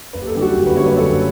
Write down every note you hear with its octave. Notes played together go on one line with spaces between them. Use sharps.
F#1 B4
G4
A4
F#2 D3 G3 G4
F#4
F#1
B4
F#2 D3 G3 C#5
B4
F#1 A4